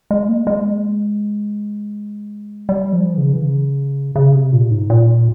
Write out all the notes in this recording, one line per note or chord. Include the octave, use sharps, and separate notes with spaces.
G#3
A#3
G#3
G3
F3
E3
C#3
E3
C#3
C#3
C3
A#2
G#2
A#2